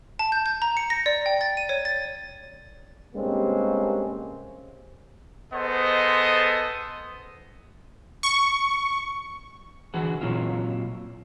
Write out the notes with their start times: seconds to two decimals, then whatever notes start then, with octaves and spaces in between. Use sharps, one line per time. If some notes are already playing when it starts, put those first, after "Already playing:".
0.19 A5
0.32 G6
0.46 G6
0.62 A#5
0.77 C#7
0.90 A#6
1.06 D5
1.26 G5
1.41 A6
1.57 D#7
1.69 C#5
1.85 A6
3.15 G2 C3 G#3 A#3 C4 C#4
5.53 B3 G#4 A4 C5 D#5
8.23 C#6
9.94 D3 E3 F#4 G#4 F#5
10.21 A#2 F#3 C4 E4 F4